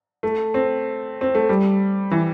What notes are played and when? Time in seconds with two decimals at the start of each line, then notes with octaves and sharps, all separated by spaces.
0.23 A3
0.54 C4
1.21 C4
1.35 A3
1.49 G3
2.11 E3